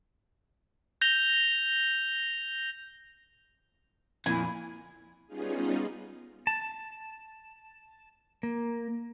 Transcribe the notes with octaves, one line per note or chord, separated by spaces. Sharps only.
G6 A#6 F7 G7
F2 A#2 E4 G#5
G3 B3 C#4 D#4 F4 G#4
A5
A#3